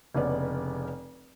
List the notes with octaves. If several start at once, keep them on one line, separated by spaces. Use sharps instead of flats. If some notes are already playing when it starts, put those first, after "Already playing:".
F1 C#3 B3 D5